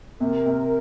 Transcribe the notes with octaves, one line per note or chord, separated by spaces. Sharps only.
C3 A#4
C3